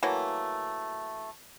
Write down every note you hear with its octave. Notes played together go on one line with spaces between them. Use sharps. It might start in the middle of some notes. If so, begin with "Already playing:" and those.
E3 F#3 A3 A#3